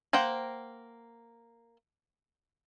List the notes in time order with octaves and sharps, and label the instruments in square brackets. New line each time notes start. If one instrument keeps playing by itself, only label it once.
[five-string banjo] A#3 C5 F#5 G5